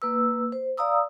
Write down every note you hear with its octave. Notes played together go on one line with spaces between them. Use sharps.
A#3 B4 E6
C5
D5 F5 A#5 D#6 E6